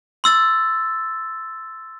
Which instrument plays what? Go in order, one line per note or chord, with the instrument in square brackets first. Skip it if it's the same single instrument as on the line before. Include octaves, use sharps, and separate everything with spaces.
[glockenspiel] C6 E6 A6